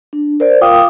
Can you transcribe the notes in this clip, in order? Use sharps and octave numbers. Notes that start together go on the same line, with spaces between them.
D4
A#4 C5 D5
F4 A#4 F5 G5 D6 D#6